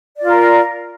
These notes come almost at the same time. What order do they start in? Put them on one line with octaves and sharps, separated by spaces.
D5 F4 A#4